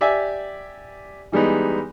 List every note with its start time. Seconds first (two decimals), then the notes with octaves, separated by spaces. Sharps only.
0.01 G4 D5 E5 G#5
1.32 E3 G3 G#3 B3 D#4